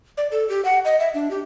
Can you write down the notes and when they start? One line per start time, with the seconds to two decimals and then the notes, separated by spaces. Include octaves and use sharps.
0.17 D5
0.31 A4
0.49 G4
0.65 F#5
0.85 D#5
1.00 E5
1.14 D4
1.31 G4